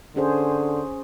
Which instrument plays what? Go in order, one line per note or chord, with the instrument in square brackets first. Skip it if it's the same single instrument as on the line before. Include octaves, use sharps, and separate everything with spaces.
[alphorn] D3 [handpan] C#4 G#4 C5